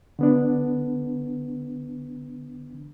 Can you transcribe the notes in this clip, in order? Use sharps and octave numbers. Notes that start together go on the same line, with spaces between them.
D3 B3 D4